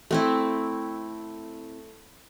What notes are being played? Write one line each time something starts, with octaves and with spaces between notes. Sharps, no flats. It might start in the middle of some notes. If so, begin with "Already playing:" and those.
A3 C4 E4